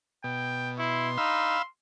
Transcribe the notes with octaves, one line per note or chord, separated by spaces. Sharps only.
B2 G5
E4 C6
D#4 F5 B5 E6